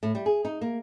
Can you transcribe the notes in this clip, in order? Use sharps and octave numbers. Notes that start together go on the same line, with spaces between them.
A2
G3
G#4
D#4
A#3